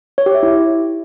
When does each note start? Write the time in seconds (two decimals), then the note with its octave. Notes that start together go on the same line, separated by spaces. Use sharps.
0.18 C#5
0.26 G4
0.34 E5
0.43 E4